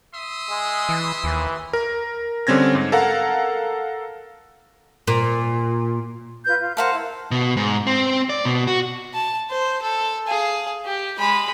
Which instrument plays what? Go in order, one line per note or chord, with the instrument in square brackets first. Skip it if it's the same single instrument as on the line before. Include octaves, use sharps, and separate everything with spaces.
[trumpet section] E5 C6 D#6
[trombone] G#3
[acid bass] E3
[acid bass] D#2 [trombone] E3
[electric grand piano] A#4
D3 G3 C4 C#4 G#6 A#6
G#2
A4 A#4 F5 F#5 A#5
[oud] A#2
[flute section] F4 B4 G6
F4
[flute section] A#4 F#5 [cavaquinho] C5 F5 A5
[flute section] E4
[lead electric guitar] B2
G#2
C4
D5
B2
F#4
[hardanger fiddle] A5
C5
A4
G#4 F5
G4
G#3 B5